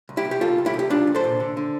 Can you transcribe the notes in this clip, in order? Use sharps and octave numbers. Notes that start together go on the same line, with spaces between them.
C2
E4 G4
C2
G4
C2 F4 A4
C2
E4 G4
C2
G4
C2 D4 F4
C2
A4 C5
A#2
D3
D3